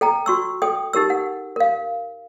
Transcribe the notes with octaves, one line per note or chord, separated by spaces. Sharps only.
A4 G5 A#5
F#4 C#6 E6
A4 G5 D#6
D#4 G4 A#4 E6
F#5
A#4 F5